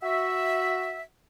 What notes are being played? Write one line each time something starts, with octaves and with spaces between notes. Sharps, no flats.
F#4 E5